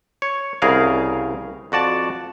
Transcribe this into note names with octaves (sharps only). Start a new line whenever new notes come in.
C#5
C2 C#3 G#4 A#4 F5
F2 F#4 D5 A5